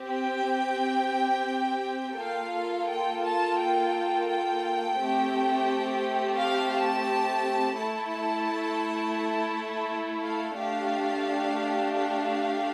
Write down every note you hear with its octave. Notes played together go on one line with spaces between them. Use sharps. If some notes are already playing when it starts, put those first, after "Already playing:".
Already playing: C4 G4
G5
A#3 F4 A4 F5
G5
A5
G5
G5
A3 C4 G4
F5
A5
A3 E4 A4 A5
A5
F5
A3 D4 G4 F5
F5